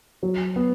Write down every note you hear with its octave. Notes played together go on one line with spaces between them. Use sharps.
F#3
B3